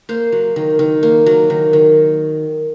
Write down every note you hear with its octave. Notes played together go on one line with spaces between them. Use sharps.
A#3 C5
F#3
D#3
D#3
A#3
F#3
D#3
D#3